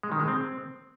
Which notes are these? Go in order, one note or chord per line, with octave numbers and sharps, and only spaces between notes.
G#3
D#3
G#3
C4